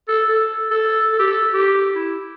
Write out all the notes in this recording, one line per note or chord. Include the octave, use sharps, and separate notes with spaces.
A4
A4
A4
A4
G4
A4
G4
E4